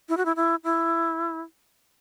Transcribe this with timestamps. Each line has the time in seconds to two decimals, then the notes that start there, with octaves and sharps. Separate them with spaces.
0.09 E4
0.17 F#4
0.25 E4
0.36 E4
0.64 E4